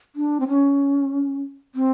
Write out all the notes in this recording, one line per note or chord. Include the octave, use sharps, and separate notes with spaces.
D4
C4
C#4
C4